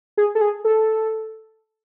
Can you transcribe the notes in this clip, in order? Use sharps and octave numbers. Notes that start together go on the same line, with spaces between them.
G#4
A4
G#4
A4